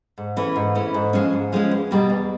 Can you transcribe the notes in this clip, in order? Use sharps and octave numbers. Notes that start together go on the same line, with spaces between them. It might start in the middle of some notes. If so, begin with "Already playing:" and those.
G#2
E3 A3 C#4 E4
G#2
E3 A3 C#4 E4
G#2
F3 G#3 C#4
G#2
F3 G#3 C#4
E2
B2 G3 A#3
E2